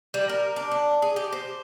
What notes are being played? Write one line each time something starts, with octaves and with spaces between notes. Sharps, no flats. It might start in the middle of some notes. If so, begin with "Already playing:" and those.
G3
A#4
D4
D4
G#4
G4
C5